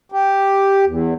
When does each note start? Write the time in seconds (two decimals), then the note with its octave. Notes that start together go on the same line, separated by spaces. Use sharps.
0.12 G4
0.87 E2